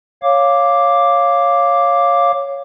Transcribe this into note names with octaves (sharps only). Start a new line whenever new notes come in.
C#5 F5 D6